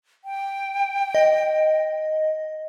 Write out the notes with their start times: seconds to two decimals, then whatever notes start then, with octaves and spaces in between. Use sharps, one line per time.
0.24 G5
1.15 D#5